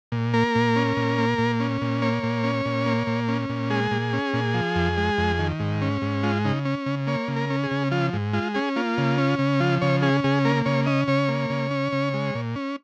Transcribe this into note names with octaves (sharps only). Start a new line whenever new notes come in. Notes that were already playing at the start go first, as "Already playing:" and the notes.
A#2
A#3 A#4
A#2
C#4
A#2
A#3
A#2
C#4
A#2
A#3 C#5
A#2
C#4
A#2
A#3
A#2
C#4
A#2
G#3 G#4
A#2
C#4
A#2
F3
F2
G#3
F2
D#3
G#2
C#4
G#2
G#3 F4
C#3 D#4
C#4
C#3
A#3 C#5
C#3
A#4
C#4
G#4
C#3
F3 F4
G#2
G#3 F4
C#4 G#4
A#3 F4
C#3
C#4
C#3
F3 F4
C#3 C#5
C#4 G#4
C#3 G#4
A#3 A#4
C#3 C#5
C#4 D#5
C#3 C#5
A#3
C#3
C#4
C#3
G#3
A#2
C#4